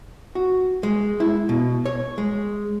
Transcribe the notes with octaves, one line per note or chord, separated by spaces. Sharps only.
F#4
G#3
E4
B2
C#5
G#3